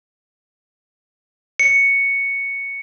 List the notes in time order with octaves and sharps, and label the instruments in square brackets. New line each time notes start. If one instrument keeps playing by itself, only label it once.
[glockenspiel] C#7